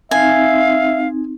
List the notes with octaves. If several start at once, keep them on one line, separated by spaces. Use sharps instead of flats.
C4 D#4 E5 F5 G#5